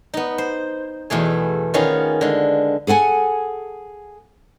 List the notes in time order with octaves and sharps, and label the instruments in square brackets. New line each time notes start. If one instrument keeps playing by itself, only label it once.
[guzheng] B3 D#4
C5
E2 B2 A3 G#4
D#3 B3 C#4 F4 G#4
D3 G#3
[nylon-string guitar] G#4 A4 F#5 G#5